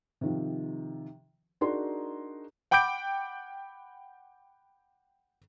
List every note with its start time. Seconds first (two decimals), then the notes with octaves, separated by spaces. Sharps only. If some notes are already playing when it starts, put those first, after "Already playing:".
0.21 C3 D#3 F3
1.61 D4 D#4 F#4 G#4 A#4 C6
2.71 F#5 G5 B5 D6 G6 D7